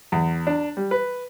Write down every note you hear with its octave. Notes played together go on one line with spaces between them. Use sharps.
E2
D4
G3
B4